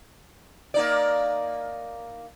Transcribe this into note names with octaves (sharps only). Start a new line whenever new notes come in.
A#3 D#4 D5